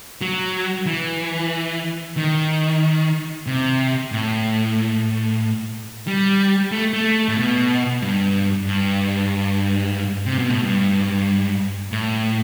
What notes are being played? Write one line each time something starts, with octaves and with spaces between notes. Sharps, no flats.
F#3
E3
D#3
C3
A2
G3
A3
A3
A2
B2
G2
G2
C3
B2
A2
G2
A2